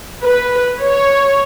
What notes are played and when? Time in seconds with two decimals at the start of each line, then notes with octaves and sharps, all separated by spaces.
0.24 B4
0.82 C#5